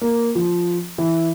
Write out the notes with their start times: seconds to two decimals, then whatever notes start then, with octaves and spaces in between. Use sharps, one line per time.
0.01 A#3
0.35 F3
0.98 E3